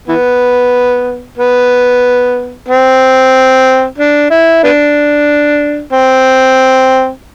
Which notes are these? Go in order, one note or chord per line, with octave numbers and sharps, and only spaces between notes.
E3 B3
B3
C4
D4
E4
B3 D4
C4